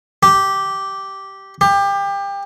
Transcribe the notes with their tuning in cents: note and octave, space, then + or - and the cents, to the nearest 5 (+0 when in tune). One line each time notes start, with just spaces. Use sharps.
G4 -10
G4 +25